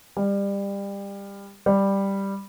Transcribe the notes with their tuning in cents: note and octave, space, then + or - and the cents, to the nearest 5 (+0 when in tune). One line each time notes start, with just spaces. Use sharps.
G3 +25
G3 +5